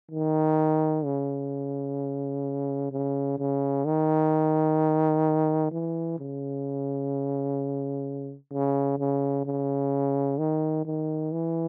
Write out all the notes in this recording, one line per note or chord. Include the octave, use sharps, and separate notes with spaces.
D#3
C#3
C#3
C#3
D#3
E3
C#3
C#3
C#3
C#3
D#3
D#3
E3